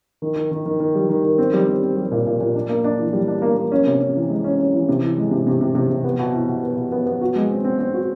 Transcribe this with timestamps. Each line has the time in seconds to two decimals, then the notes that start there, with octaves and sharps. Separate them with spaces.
0.22 D#3
0.36 D#3
0.51 D#3
0.66 D#3
0.80 D#3
0.95 G3
1.09 D#3
1.24 D#3
1.38 C4
1.53 G3
1.68 C4
1.83 C4
1.97 G3
2.11 A#2
2.26 A#2
2.40 A#2
2.55 D4
2.69 A#3
2.84 D4
2.99 E3
3.13 G3
3.28 D4
3.42 A#3
3.57 A#3
3.72 C#4
3.86 C3
4.01 C#4
4.16 E3
4.30 G#3
4.44 C#4
4.59 C#4
4.74 E3
4.89 C3
5.02 E3
5.18 G#3
5.31 C3
5.47 C3
5.61 C3
5.75 C3
5.90 C3
6.04 B3
6.19 B2
6.34 E4
6.49 B2
6.63 B3
6.77 B2
6.92 B3
7.06 B3
7.21 F#4
7.36 G#3
7.50 C4
7.64 C4
7.79 C4
7.93 F#4